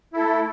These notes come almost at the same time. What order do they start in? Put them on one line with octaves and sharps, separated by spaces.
E4 A4 A3